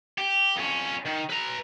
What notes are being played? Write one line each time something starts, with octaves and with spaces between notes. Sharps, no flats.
G4
F2 C#4
D#3
B4 A#5